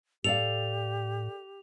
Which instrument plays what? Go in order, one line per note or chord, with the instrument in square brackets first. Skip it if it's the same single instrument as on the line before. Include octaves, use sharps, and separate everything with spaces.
[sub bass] A2 [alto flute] G4 [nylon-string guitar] A4 D5 F5 [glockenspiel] F7